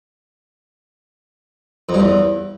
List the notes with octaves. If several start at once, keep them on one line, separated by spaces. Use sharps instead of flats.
F2
G2
E2